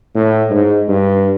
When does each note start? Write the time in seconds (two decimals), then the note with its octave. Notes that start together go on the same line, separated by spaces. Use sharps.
0.15 A2
0.50 G#2
0.88 G2